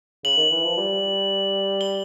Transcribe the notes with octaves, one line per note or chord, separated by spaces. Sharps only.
C#3 F#7
D#3
E3
F3
G3
G7